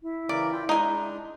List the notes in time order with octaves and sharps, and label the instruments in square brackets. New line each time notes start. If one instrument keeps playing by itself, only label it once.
[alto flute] E4
[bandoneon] C#3 E3 A#4 [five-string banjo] D5
[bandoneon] F4 G5
[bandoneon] G#3 D4 [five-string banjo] D#4 G#5